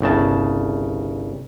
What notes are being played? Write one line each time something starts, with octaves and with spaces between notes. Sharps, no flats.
G1 C2 C#3 A5